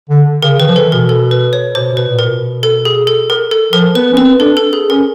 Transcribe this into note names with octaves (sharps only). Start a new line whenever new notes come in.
D3
C#3 A#4
D#3 B4
F3
E3 A4
B2 A#4
A4
B4
C#5
B2 C5
B2
B4
A#2
A#4
B2
A4
G#4
A4
A#4
A4
F3 A#4
B3 B4
C#4
C4 B4
D4 A4
A4
G#4
C#4 A#4